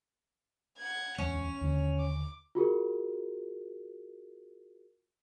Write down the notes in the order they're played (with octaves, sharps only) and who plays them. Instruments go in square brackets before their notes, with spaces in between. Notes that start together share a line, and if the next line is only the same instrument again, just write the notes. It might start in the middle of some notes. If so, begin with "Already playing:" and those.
[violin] F#5 G#6
[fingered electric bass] D1 E2 G#3 [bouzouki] C#4 [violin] F7
[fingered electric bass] D#2 D3
[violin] D6
[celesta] F4 F#4 G#4 A#4